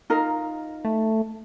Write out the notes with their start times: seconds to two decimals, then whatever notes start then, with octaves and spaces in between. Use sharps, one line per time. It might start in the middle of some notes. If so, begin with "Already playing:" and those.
0.10 D#4 F4 A#4
0.85 A3